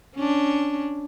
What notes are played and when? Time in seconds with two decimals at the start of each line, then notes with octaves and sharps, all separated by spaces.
0.15 C#4 D4